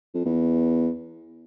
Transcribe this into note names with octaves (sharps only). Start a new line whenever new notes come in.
F2
E2